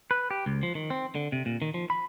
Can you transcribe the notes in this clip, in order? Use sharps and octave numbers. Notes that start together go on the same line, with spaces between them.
B4
G4
C#2
F3
D#3
C4
D3
C3
A#2
D#3
F3
B5